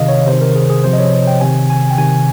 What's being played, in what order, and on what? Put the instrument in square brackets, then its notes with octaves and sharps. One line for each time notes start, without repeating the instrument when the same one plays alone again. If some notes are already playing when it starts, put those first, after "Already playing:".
Already playing: [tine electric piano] C3 D#3 D#5 F5
C#5
C3 D#3 C5
A#4
G#4
G#4
C3 F3 C5
D#5
C#5
G5
C3 D#3 G#5
G#5
G5
C3 D#3 G#5